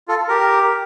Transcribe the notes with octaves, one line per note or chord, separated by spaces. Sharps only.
F4 A4
G4 A#4